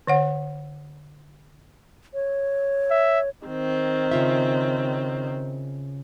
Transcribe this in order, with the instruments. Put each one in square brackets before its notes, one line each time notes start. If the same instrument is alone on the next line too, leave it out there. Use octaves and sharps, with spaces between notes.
[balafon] D3 C#5 F#5
[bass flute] C#5
[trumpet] E5
[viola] D#3 C4
[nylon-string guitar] C#3 F4 E5